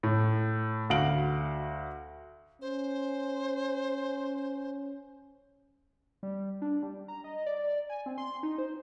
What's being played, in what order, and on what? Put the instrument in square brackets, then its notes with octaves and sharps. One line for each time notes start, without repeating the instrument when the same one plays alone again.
[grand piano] A2
D2 F#4 F5 D7 F#7
[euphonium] C#4 [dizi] C5
[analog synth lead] G3
D4
G3
A#5
D#5
D5
G#5
C4
C6
D#4
C5